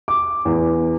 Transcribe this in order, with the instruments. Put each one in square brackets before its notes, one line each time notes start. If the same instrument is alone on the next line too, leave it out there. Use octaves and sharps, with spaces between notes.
[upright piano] D6
E2